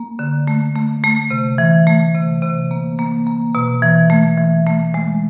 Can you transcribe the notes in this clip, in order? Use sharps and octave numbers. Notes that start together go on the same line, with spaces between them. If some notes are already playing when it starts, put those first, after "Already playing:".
Already playing: A#3
D3
A3
A3
A3
C3
E3
A3
C3
C3
A#3
A#3
A#3
B2
E3
A3
E3
A3
G#3